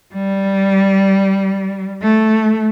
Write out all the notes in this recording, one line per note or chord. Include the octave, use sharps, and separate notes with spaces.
G3
A3